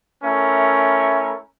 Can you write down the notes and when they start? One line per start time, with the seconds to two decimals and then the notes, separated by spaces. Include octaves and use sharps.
0.23 A3 C#4 E4 A#4 E5